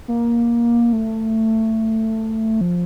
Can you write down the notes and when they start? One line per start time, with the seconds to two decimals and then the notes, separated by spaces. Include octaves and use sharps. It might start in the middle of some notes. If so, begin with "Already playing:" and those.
0.08 A#3
0.93 A3
2.61 F3